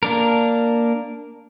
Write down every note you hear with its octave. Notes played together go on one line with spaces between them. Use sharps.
A#3 D4 A#4